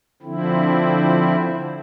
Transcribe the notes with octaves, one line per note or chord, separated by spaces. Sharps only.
D3 F3 C4 E4